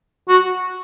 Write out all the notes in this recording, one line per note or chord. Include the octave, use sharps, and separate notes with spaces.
F#4